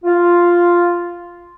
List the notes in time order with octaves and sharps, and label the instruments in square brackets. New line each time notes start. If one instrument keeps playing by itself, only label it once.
[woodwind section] F4